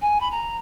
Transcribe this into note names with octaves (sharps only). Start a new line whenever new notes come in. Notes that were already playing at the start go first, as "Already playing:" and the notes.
G#5
B5
A#5